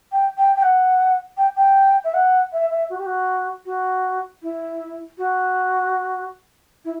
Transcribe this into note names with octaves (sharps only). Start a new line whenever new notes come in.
G5
G5
G5
F#5
G5
G5
E5
F#5
E5
E5
F#4
G4
F#4
F#4
E4
F#4
E4